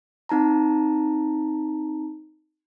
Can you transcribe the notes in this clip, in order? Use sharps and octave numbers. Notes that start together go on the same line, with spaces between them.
C4 D#4 A5 A#5